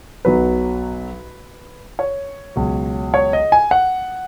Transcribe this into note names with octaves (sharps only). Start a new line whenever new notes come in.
B1 B2 F#3 B4
C#5
C#2 B2 F#3
C#5
D#5
G#5
F#5